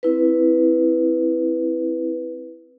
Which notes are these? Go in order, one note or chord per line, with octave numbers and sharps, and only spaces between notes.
C4 E4 B4